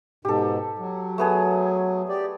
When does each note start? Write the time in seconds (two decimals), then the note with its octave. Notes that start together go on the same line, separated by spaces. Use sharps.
0.25 G#2 B2 G4 A4
0.79 F#3
1.18 A3 B3 G#4
2.09 G4 D5